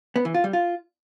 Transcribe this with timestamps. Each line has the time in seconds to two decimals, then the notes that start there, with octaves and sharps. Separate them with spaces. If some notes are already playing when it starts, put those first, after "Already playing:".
0.16 B3
0.25 E3
0.34 F4
0.44 G3
0.53 F4